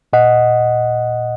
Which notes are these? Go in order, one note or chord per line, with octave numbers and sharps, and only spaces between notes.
A#2 D#5 F#5